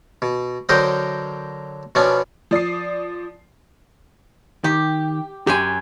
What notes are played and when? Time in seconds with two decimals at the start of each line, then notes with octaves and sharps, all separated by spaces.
0.22 B2
0.69 D3 F#3 A#4 C5 D#5 G5
1.95 B2 F3 B3 C#4 D4
2.51 F3 D5 D#6 C7
4.64 D#3 G4
5.47 F#2 G4 G5 G#5 C6